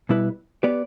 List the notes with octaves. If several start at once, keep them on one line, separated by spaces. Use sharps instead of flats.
B2 G3 E4 B4
B3 G4 B4 D5